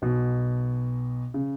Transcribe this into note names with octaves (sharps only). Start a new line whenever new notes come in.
B1 B2
C#3